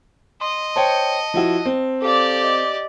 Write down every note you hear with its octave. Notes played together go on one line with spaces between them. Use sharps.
D#5 C6
C5 C#5 G5 A5 C#7
F3 E4 F#4
C4
G4 A4 D5 F5
D#5